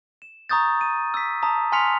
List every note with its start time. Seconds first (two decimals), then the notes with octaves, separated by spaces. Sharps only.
0.22 E7
0.49 A#5 C#6 D#6 G6 A6
0.81 D#7
1.14 E6 B6
1.42 A5 A#5 D#6
1.72 G#5 C6 F6 B6 C#7 F7